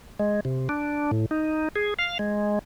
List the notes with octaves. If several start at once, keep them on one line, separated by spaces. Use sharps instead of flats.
G#3
C3
D4
A2
D#4
G#4
F5
G#3